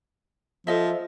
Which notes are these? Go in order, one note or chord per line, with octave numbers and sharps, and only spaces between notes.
F3 A4 D#5 E5